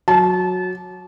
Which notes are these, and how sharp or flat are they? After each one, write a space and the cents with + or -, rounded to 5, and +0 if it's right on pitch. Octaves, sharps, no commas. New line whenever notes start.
F#3 -15 A5 -30